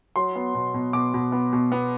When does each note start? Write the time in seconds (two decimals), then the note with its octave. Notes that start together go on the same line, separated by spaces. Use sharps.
0.16 F#3 C6
0.36 B3
0.54 B2
0.74 B2
0.93 B2 D6
1.14 B2
1.32 B3
1.53 B2
1.72 B3